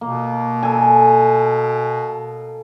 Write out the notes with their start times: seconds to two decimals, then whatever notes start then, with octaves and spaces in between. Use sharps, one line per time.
0.01 B2 A#3
0.63 A4 G#5